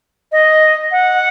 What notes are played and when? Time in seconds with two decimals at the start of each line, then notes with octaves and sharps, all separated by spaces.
0.32 D#5
0.92 F#5